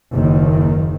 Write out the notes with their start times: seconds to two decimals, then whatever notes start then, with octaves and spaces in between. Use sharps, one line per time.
0.14 F#1 D#2 D#3